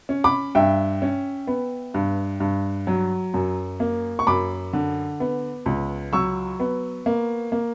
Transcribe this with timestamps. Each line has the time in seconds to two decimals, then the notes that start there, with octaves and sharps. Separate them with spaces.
0.09 C#4
0.24 B5 D6
0.55 G2 E5 G5
1.02 C#4
1.47 B3
1.94 G2
2.40 G2
2.87 F#3
3.34 F#2
3.80 A#3
4.19 C#6
4.27 F#2 B5 D6
4.73 D3
5.20 B3
5.66 C#2
6.12 F#3 C#6 E6
6.60 B3
7.06 A#3
7.52 A#3